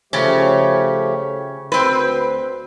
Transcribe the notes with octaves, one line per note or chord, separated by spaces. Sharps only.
C#3 F3 A3 C#4 G4
D2 C4 B4